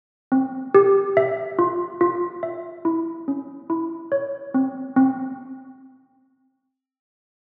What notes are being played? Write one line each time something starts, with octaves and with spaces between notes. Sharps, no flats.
C4
G4
E5
F4
F4
E5
E4
C#4
E4
C#5
C4
C4